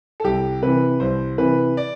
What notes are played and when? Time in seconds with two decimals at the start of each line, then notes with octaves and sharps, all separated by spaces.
0.20 A4
0.24 C2 G4
0.62 C3 E3 B4
1.00 C2 C5
1.38 C3 E3 B4
1.77 D5